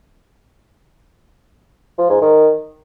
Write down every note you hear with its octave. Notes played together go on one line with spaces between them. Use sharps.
F3
G#2
D#3